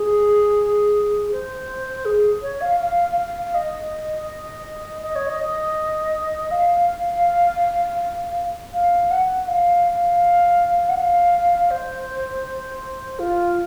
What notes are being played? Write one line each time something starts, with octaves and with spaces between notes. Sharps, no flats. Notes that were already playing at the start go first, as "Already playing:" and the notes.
Already playing: G#4
C5
G#4
C#5
F5
F5
F5
D#5
D#5
C#5
D#5
F5
F5
F#5
F5
F#5
F5
C5
F4